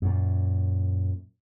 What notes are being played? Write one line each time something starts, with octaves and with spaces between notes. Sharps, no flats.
F#2 A#2